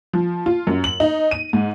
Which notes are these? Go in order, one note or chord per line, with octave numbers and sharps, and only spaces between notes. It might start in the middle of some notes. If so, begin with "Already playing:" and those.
F3
F4
F#2
F#7
D#4
D#7
G#2